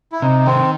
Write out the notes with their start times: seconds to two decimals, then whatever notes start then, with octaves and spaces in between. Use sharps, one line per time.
0.12 E4
0.22 C3 D#4
0.46 D#3 C4